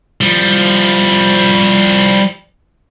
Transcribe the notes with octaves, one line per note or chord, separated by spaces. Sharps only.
F3 G3